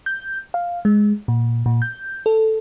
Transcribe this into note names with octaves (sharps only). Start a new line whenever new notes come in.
G6
F5
G#3
A#2
A#2
G6
A4